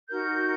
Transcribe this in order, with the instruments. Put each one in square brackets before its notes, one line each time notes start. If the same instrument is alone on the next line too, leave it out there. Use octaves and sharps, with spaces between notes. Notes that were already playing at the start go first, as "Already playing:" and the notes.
[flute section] D#4 F#4 A#4 G6